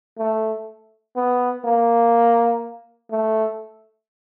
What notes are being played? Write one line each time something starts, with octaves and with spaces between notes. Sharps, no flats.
A3
B3
A#3
A3